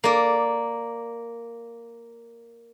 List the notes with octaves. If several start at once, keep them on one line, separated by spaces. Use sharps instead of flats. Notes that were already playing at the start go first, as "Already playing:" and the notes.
A#3 D5